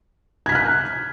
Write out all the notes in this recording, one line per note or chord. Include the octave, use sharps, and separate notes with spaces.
F6 F#6 G#6 B6